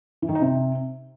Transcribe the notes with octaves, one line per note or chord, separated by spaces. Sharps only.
E3
D#3
D#4
C3